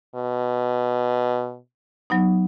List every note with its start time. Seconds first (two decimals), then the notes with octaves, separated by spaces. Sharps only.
0.15 B2
2.10 F#3 B3 D#4